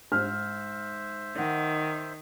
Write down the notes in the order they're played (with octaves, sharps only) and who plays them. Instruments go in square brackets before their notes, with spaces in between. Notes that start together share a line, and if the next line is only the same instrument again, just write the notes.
[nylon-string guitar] G#2 [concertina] C5 E5 [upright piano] F6
[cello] D#3 [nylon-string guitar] D#5 F#5